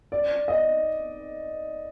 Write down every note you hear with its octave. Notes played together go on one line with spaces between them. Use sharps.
D5
D#5